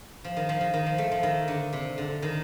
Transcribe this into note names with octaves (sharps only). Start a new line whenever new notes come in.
F3
D#3
F3
D#3
D#3
F3
A3
F3
D#3
D3
C3
D3
D#3